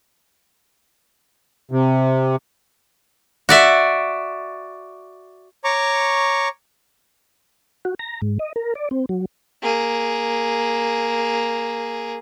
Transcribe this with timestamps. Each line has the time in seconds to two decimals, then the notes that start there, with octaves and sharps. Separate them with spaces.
1.71 C3
3.49 F#4 D5 E5
5.64 C#5 A#5 C#6 D6
7.85 F#4
7.99 A#5
8.22 G#2
8.39 D#5
8.56 A#4
8.75 D5
8.91 C4
9.09 F#3
9.63 A#3 G#4